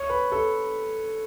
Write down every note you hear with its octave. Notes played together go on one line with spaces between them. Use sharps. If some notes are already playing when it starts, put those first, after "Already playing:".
Already playing: C#5
B4
A4